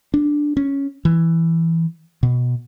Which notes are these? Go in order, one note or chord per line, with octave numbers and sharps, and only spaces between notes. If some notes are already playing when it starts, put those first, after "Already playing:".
D4
C#4
E3
B2